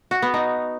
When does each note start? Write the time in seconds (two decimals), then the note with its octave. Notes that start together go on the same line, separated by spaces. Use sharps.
0.11 F#4
0.22 B3
0.34 D#4